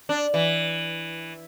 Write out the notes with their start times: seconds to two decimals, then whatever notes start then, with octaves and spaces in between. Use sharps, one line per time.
0.09 D4
0.34 E3